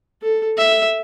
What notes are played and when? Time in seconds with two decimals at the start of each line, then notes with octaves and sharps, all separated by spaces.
0.22 A4
0.57 E5